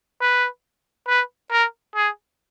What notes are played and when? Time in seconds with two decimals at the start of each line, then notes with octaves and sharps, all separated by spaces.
0.21 B4
1.08 B4
1.51 A#4
1.95 G#4